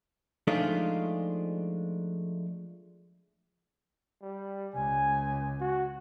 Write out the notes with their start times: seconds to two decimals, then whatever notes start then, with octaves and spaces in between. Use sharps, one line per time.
0.47 F3 G#3 A3 D4 D#4 F4
4.22 G3
4.74 C#2 G#5
5.60 F#4